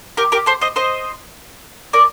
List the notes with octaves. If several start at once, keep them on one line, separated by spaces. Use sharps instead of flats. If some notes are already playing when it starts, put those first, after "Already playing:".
G4 A#4
G4 A#4
A4 C5
C5 D#5
C5 D#5
A#4 D5